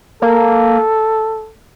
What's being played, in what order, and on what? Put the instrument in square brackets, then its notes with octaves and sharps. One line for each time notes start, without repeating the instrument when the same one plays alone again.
[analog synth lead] A#3 [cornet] A4